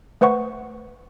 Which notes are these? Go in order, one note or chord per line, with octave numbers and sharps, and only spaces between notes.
A3 B4 C5 F#5 C#6